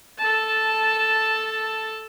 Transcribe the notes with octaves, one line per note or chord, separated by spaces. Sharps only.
A4 A5